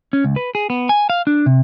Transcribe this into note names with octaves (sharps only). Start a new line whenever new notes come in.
C#4
C#2
B4
G#4
B3
G#5
F5
D4
C3